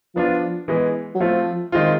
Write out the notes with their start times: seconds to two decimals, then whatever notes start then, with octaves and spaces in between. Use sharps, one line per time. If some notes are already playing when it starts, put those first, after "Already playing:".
0.16 F3 B3 D4 F4
0.68 E3 G#3 B3
1.15 F#3
1.20 F3 A3 C4 F4
1.72 D#3 G#3 C4 F4